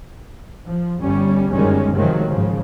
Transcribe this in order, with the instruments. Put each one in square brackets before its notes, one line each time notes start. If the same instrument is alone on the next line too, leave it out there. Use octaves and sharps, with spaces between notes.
[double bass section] F3
G1 G3 C#4
G1 F#2 D#3 G3 G#3 C#4
C3 D#3 F3 F#3 G#3 A3
G#2 C#3 F3